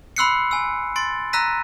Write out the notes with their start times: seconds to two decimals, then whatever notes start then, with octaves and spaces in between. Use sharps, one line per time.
0.16 B5 C6 E6 F#6 C7 C#7
0.51 G#5 E6
0.96 C6 A6 D7
1.33 A#5 E6 F#6 A#6 B6 D#7